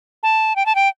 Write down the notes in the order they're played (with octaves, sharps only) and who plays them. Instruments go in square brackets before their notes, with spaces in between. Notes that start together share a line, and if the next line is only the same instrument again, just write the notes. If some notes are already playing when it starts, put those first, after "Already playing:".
[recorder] A5
G5
A5
G5